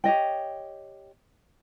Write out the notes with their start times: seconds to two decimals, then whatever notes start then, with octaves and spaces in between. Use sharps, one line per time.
0.04 G4 C#5 D#5 G5